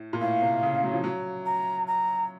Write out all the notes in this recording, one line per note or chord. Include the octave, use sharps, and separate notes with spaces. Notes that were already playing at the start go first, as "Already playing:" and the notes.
Already playing: A2
A#2
A2 F5
C3
C#3
F#3
F3
F#3
A#5
A#5